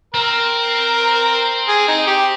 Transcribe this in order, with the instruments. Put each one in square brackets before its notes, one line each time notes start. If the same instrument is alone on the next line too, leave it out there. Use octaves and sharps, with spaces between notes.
[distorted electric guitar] C4 [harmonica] A#4
[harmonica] G#4
D#4
G4